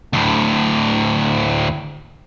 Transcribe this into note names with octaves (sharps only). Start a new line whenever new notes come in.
D2 A2